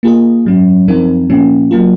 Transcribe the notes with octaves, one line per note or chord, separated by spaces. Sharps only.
A#3 F4 G#4 D#5
G#2 F#3 C#4
F#2 F3 C4 D#4 A#4
A#2 F3 A#3 C#4
F#3 A#3 F4